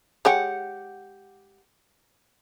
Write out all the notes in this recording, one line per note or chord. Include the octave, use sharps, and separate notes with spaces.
G#3 G4 C#5 F#5 G5